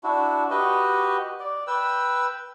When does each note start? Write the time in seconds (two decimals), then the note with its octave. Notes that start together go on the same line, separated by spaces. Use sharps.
0.04 D4 E4 F#4
0.51 F#4 G4 B4 D#5
1.40 D5
1.67 B4 G5 E6